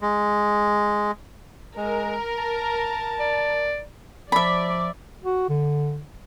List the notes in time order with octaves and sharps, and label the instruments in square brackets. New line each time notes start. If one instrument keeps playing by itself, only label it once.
[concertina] G#3
[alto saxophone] G#3 [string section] A#4
[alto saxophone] A5
[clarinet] D5
[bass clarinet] F3 [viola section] D5 [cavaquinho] E5 B5
[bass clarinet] F#4
D3